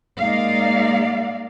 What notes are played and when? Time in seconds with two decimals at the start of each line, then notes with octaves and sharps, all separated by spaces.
0.20 G#3 A#3 D#4 D5 F5